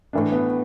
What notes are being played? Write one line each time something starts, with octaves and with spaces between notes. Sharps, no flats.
A2 E3 D4
B3